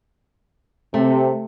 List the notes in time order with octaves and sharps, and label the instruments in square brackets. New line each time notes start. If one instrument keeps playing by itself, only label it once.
[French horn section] C3 [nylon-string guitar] A3